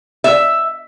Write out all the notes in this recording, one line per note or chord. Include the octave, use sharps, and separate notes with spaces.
E5